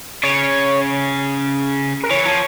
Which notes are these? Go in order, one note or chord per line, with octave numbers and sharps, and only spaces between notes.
C#3 C#5
A#4
E3 C#5
F3